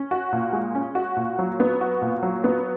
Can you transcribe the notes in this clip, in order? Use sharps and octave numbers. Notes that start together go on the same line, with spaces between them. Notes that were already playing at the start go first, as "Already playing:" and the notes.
Already playing: C#4
F#4
A#2
G#3
C#4
F#4
A#2
F#3
B3
F#4
A#2
F#3
B3